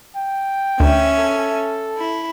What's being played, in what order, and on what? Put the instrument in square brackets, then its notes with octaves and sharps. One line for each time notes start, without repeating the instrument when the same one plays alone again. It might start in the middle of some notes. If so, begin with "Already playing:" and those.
[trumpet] G5
[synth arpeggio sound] D2 [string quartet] C#4 E5 G#5
[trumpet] A4
[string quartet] E4